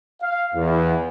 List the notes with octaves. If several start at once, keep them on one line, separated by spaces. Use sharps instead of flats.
F5
E2